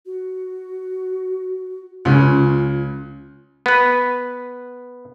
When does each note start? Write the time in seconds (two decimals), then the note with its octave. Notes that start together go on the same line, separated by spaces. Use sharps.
0.06 F#4
2.05 C#2 C#4 F4
3.66 B3 B4